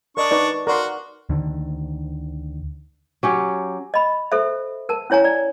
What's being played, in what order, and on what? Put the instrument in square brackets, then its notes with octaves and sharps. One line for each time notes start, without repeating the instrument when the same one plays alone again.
[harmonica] D4 C#6 [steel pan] A#4 D5 D#5
[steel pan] D#4 B4 D5
[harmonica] F#4 [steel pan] A#4 D5 C6
[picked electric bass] D2 D3 D#3
[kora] F#3 C#4 G4
[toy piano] D#5 B5
A4 C5 E5
A#4 A5
C#4 E4 C#5 G#5 A#5
D5